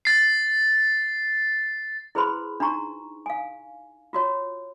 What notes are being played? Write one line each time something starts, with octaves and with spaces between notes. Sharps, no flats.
A6 C7
E4 G#4 B4 C5 B5 C6
D4 D#4 F#4 A#5 C#6
F5 G#5
F4 F#4 C#5